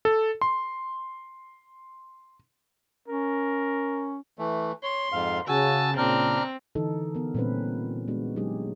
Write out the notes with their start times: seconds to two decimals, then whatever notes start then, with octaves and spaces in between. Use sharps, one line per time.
0.05 A4
0.41 C6
3.08 C#4 A#4
4.39 E3 A3
4.83 C#5 C6
5.12 F2 G#2 F5
5.48 C#3 F#4 G#5 A5 E6
5.97 A#2 C#3 C4 D4 A#5 F6
6.75 D3 E3 D#4 A4
7.15 B3 A#4
7.35 A#2 G3 C4 C#4 B4
8.08 G#3 B3 D4 F#4
8.36 F#3 G#3 D#4 G4 G#4